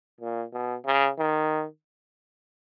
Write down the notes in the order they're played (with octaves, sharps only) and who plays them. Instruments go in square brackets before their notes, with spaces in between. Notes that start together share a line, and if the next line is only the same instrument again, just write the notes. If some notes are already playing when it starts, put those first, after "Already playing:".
[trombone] A#2
B2
C#3
D#3